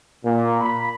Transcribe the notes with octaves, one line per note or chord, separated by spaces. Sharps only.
A#2
B5